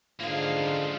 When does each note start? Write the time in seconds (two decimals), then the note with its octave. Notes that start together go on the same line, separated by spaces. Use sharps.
0.20 G#2 D3 A#3 F4 G#4 F5
0.57 C#3 F3